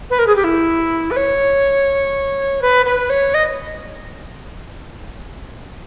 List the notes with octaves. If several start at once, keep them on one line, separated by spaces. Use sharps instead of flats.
B4
A#4
G#4
G4
E4
B4
C#5
B4
B4
C#5
D#5